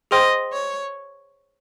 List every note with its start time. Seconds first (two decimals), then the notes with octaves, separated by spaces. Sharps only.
0.11 G#4 C5 D#5 G5 C6 F6
0.53 C#5